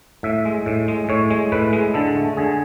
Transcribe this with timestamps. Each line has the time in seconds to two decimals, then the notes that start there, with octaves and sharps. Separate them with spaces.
0.23 A2 E5
0.45 G#3
0.66 A2
0.88 G#3
1.09 A2 C#5
1.30 G#3
1.52 A2 B4
1.73 G#3
1.94 D3 A4
2.17 A3
2.37 D3 G#4